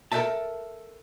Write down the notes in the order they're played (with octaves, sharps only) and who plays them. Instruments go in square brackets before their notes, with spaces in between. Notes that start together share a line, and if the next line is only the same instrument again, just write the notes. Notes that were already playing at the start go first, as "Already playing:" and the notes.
[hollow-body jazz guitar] A4 A#4 C5 C#5 E5 A5